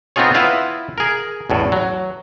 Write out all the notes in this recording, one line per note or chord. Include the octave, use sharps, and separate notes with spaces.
B3 C4 D#4 F4 G#4 C#5
B3 E4 F4 B4 E5 F5
G#4 A#4
A1 E2 A2
F#3